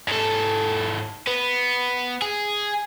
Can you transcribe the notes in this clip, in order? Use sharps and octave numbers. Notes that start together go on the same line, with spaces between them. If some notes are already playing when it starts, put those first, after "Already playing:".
G#2 A4
B3
G#4